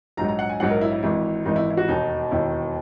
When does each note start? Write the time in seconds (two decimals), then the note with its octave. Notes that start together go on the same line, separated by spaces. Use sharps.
0.17 A#1 G#2 F#3 A#5
0.28 A#5
0.39 F#5
0.49 G#5
0.60 A#1 G#2 F#3 F#5
0.71 A#4
0.81 E4
0.92 E4
1.02 G#1 G#2 E3 E4
1.46 G#1 G#2 E3 D#4
1.56 E4
1.70 E4
1.77 F#4
1.88 E1 D#2 D#3 D#4
2.31 E1 D#2 D#3 E4